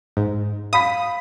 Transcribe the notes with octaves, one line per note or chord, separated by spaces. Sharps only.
G#2
F5 B5 D#6 B6